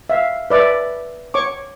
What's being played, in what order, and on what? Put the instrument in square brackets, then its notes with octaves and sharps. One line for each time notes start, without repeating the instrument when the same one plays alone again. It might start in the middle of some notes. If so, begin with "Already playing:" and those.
[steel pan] E5 F5
B4 D5 E5
C#5 C#6 D6